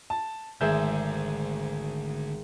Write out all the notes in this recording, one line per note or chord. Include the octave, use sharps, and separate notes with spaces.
A5
G#1 D2 G#4 E5 G6 E7